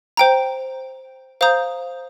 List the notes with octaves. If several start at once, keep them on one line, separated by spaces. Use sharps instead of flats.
C5 G5 A#5
C5 F5 A#5 D#6 G6